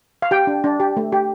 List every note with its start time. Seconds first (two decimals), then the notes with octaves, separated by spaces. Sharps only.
0.22 F5
0.31 G4 G5
0.47 D4
0.64 D4
0.80 G4
0.97 A3
1.12 G4